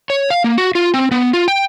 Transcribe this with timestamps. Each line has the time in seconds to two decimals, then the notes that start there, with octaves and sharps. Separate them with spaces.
0.10 C#5
0.30 F5
0.44 A#3
0.58 F#4
0.75 F4
0.94 C4
1.11 B3
1.33 F4
1.48 G5